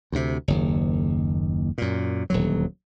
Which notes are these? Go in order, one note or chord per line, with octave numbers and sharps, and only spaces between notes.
D2 C3
F#1 D#2
F#2 A#2
D#1 D2 F#3